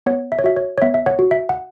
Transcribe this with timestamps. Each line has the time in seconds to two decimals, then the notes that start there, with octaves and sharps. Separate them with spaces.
0.06 B3 C#5 F#5
0.32 E5
0.39 C#5
0.44 F#4 E5
0.56 C#5
0.78 C#5
0.82 B3 E5
0.94 E5
1.06 C#5 F#5
1.19 F#4
1.31 E5
1.49 F#5